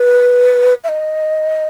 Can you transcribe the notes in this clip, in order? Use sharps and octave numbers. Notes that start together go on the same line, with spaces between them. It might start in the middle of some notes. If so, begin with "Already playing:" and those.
Already playing: B4
E5
D#5